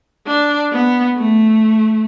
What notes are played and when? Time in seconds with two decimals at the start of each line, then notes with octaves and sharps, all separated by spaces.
0.27 D4
0.72 B3
1.17 A3